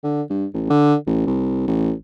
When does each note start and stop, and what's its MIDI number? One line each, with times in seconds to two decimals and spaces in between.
0.04 0.22 50
0.30 0.46 43
0.54 0.70 33
0.70 0.95 50
1.07 1.24 33
1.26 1.65 36
1.68 1.93 33